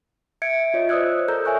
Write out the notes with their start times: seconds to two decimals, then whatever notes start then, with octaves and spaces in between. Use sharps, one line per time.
0.42 E5 G#6 C#7 D7
0.74 F4 C#5 D#5
0.89 C5 D5 D#6 E6 F#6 G#6
1.28 A4 A#4 A#5 E6 G6
1.45 C#5 E5 G#5 C#6 F#6